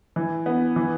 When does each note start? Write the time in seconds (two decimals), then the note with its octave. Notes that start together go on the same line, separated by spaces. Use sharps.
0.16 E3
0.46 B3
0.76 E3